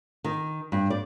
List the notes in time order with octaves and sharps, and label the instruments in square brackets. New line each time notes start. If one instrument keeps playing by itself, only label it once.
[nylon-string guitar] D#3
G2
D5